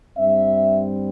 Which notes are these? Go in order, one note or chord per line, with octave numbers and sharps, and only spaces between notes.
G2 G3 C4 E5